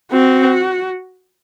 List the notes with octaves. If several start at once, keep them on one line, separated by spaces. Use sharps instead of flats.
C4 F#4